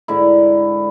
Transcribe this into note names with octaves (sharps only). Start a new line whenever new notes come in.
G#2 D3 E4